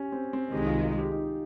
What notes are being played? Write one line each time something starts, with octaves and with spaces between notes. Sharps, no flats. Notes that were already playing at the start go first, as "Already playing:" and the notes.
Already playing: C#4 G4
C4
C4
C2 C3 D#3 G#3 G4
D#4
F4
F4
G4
D#4